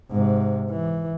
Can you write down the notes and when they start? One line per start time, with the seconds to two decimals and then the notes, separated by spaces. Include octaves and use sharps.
0.11 G#2 C3
0.70 E3